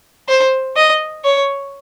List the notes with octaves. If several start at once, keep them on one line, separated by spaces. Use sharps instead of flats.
C5
D#5
C#5